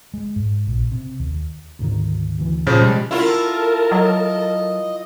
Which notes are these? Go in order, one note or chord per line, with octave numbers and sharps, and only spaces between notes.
G#3
G#2
A#1
C3
D#2
D2 G#2 D#3
D2 E3
A#2 C#3 F3
B2 G3 G#3
E4 F4 A4 A#4 A5
F#3 D#5